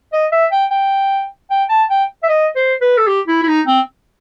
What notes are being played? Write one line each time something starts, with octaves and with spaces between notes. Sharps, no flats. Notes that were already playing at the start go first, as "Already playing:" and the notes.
D#5
E5
G5
G5
G5
A5
G5
E5
D#5
C5
B4
A4
G4
E4
E4
D#4
C4